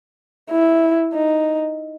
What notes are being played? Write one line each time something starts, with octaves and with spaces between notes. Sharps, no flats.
E4
D#4